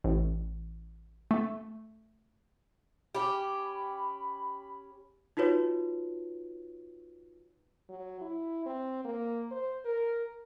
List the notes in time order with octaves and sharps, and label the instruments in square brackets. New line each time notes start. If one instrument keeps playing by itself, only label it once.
[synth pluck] A1
A3
[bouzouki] C#4 G4 [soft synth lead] B5
[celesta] D#4 F4 F#4 B4 C#5
[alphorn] F#3
E4
C4
A#3
C5
A#4